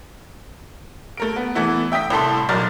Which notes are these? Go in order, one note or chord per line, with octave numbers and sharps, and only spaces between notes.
A3 A#4 D7
B3
E3 A3 B3 E4
E5 G5 D#6 B6
C2 A2 A4 C6
B1 F#3 A#4 D5 F6 A6